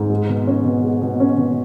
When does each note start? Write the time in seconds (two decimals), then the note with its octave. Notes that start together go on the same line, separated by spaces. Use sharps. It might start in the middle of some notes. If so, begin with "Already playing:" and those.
Already playing: G#2
0.10 G#3
0.29 B2
0.47 C#4
0.64 B2
0.83 G#3
1.02 B2
1.20 C#4
1.37 B2